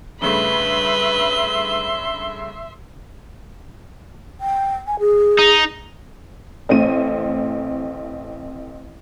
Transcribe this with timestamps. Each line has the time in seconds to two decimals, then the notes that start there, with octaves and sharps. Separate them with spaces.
0.22 G2 C#3 A3 B4 E5 C6 G7
4.41 G5
4.87 G#5
4.99 G#4
5.39 D#4
6.69 A1 A3 C4 D#7